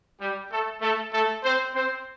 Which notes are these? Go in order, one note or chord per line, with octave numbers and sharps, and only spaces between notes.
G3 G4
A3 A4
A3 A4
A3 A4
C4 C5
C4 C5